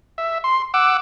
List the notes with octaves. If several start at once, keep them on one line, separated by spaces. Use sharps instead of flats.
E5
C6
F#5 D6 E6